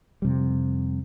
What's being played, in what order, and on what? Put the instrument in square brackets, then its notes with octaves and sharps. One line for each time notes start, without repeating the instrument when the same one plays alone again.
[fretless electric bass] F2 C3 G3